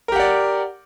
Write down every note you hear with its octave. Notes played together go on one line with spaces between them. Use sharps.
G4 A#4 D5 F#5